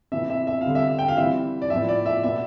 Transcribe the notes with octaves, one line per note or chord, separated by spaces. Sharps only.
C3 E3 B3 E5
E5
E5
D3 G3 C4 F5
E5
G5
F5
E3 G3 C4 E5
D5
A2 F3 B3 E5
D5
E5
B2 B3 E5